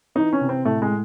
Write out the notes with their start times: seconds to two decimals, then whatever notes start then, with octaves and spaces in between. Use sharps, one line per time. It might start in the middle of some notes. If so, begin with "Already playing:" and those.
0.15 E3 D#4
0.33 C#4
0.41 C3
0.49 C4
0.65 A2 A3
0.82 G#3